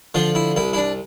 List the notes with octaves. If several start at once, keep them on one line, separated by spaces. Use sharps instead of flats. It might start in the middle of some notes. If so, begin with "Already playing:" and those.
D3 F3 F4
E4
C2 E4
E4
D4